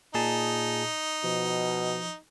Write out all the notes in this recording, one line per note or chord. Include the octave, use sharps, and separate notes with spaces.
A#2 D#4 G#4 A5
B2 F3